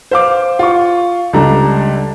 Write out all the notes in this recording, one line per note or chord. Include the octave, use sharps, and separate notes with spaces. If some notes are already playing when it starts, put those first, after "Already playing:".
C5 F5 D6
F4 C#6
C#2 G3 D4 A4 A#5